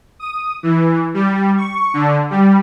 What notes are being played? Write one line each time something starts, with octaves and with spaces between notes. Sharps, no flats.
D#6
E3
G3
C#6
D3
G3